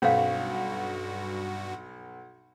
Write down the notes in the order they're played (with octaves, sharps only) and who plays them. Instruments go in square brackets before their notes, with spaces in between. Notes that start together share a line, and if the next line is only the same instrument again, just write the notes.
[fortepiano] B1 [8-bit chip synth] G2 F#4 [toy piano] C#4 C5 F5